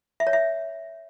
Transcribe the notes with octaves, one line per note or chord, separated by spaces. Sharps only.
E5
C#5
E5